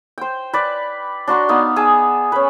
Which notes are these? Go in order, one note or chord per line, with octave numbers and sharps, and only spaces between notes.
C5 G5
B4 D5
D4 F#4 A#5 C6
B3 D#4 F5
G#4 A5 D#6 E6
C#4 B4